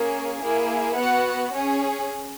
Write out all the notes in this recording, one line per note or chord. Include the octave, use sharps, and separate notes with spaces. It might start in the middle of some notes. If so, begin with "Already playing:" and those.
Already playing: A#3 C#4 G#4
A#3 E4 G#4
B3 F#4 F#5
C#4 G#4